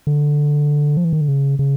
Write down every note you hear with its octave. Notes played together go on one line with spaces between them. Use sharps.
D3
F3
E3
D#3
D3
C#3
C#3